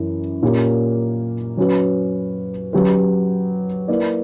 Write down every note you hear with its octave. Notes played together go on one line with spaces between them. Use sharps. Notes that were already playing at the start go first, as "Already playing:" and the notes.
Already playing: F#2 E3
A#2 A#3 C#4 G4
F#3 C#4 F#4 B4
F#3 C#4 G4 B4
A#3 E4 B4 D5